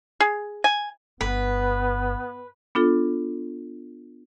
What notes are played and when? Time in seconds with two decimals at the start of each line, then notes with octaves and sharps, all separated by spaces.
0.20 G#4
0.64 G#5
1.21 G1 B3 B4
2.75 B3 D4 F4 A4